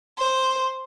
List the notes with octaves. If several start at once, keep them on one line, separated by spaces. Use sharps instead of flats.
C5